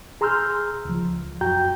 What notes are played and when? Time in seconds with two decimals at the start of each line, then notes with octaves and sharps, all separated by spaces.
0.21 G#4 A#5 C6 E6 F6 G6
0.85 C#2 F3
1.41 F#2 F#4 G5 A#5 G6